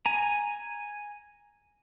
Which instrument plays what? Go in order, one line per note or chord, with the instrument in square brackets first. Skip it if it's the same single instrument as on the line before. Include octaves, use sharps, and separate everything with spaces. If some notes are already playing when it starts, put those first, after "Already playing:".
[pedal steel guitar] G#5 A#5